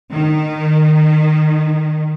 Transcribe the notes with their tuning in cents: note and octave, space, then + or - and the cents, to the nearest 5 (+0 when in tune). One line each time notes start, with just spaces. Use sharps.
D#3 -15